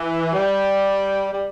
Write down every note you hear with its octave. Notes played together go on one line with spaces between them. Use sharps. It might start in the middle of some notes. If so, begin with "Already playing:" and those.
Already playing: E3
G3
G3